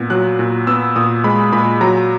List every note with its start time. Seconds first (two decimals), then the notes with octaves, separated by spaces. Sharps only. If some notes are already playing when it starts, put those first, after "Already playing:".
Already playing: A#2 B3
0.10 F#3 F#6
0.39 A#2
0.67 B3 E6
0.96 A#2 D#6
1.24 G#3 B5
1.52 A#2 B5
1.81 F#3 A#5